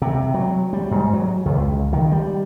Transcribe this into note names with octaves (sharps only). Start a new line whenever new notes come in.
C3
F#3
G3
G#2
F#3
C#2
D#3
G3